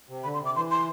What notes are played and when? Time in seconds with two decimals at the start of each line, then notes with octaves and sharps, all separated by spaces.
0.09 C3
0.24 D3 B5
0.34 C6
0.40 C3
0.45 D6
0.56 E3 C6
0.71 C6